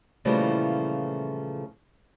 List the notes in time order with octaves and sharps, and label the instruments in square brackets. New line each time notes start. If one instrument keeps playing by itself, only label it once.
[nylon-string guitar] A#2 C#3 E3 F3 G3 A3